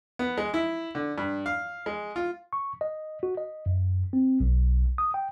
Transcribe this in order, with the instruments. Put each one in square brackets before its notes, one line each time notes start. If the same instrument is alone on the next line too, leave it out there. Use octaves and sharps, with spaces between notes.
[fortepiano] B3
G#3
E4
D3
G2
F5
G#3
F4
[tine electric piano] C#6
D#5
F#4
D#5
F#2
C4
B1
D#6
G5